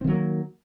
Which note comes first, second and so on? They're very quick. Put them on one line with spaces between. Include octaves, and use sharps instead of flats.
C4 D#3 F#3 A#3